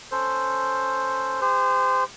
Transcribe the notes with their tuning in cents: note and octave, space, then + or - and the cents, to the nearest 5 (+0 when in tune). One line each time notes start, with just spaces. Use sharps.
C#4 +0 A4 +0 C5 +0
G4 +45 C5 -25